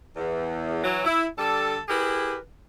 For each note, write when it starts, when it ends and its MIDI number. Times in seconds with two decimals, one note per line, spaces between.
0.16 0.82 40
0.83 1.02 52
0.83 1.02 54
1.05 1.25 64
1.38 1.78 50
1.38 1.78 55
1.38 1.78 69
1.89 2.36 64
1.89 2.36 67
1.89 2.36 68
1.89 2.36 70
1.89 2.36 71